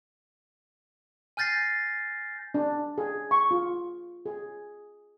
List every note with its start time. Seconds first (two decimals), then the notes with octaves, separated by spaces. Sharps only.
1.37 G#5 F6 G6 A6 A#6 C7
2.54 D4
2.98 G#4
3.31 C#6
3.51 F4
4.26 G#4